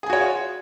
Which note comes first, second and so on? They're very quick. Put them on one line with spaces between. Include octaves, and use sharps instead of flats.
G#4 G#5 F#4 C#5 F4